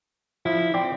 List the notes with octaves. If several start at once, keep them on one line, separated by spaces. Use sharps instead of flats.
F3 E4
C4 D5 G5